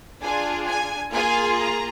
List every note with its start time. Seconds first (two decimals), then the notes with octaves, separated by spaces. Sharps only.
0.21 D4 F4 G#4 G#5
0.67 G#5
1.12 A#3 F4 G#4 G#5
1.58 A#5